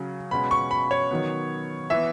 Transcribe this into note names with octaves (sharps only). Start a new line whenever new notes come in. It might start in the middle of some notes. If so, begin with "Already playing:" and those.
Already playing: C#3 F#3 C#4
B2 G#3 C#4 B5
C#6
B5
C#5
D#3 F#3 B3
E3 B3 E5